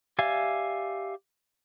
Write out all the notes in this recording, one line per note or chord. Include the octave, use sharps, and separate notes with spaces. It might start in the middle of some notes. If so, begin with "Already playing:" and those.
G4 D5 E5 F5 G#5